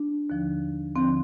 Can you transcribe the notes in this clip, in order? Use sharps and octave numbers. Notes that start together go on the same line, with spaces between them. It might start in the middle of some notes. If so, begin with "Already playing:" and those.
Already playing: D4
D#2 D3 F3
D#2 D3 F3 C4